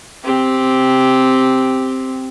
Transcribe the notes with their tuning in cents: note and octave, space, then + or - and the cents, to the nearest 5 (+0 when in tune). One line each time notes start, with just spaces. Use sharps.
C4 +0 G4 +0